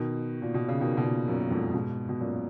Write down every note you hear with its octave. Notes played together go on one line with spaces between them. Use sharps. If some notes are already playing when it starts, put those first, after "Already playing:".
Already playing: B2 D#3
A#2
B2
C#3
B2 D#3
B2
A#2 C#3
F#2 A#2
F2 G#2
G#2 B2
B2
F#2 A#2